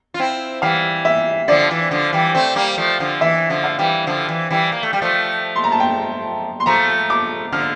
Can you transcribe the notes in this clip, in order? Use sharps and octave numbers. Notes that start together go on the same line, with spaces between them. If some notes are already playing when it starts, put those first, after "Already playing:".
F4
C4 E4
E3 G3 F5
E5
D3 F3 D5
E3
D3 F3
E3 G3
A3 C4
G3 A#3
F3 A3
D3 F3
E3 E5
D3 F3
F5
E3 G3
D3 F3
E3
E3 G3
A#3
A3
G3
F3 A3
C6
A#5
A5
G5
C6
F3 A3 A#5
D6
D3 F3 F6